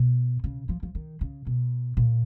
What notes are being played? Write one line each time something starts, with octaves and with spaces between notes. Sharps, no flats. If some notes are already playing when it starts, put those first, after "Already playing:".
Already playing: B2
C#3
F3
F3
D#3
C#3
B2
A#2